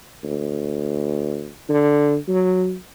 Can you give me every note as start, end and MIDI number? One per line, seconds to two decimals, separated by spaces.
0.24 1.50 38
1.69 2.17 50
2.28 2.75 54